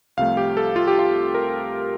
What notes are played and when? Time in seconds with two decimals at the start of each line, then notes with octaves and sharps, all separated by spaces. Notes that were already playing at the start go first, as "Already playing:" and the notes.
0.17 C2 C3 F3 A3 F5
0.37 G4
0.57 A4
0.76 F4
0.87 G4
0.99 F4
1.34 A#4